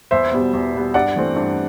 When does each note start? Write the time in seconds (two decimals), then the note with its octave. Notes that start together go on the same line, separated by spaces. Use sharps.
0.11 E2 C5 E5
0.32 B2 G3 B3
0.54 E2
0.73 B2 G3 B3
0.94 G2 D5 F#5
1.16 E3 A3 C4
1.36 G2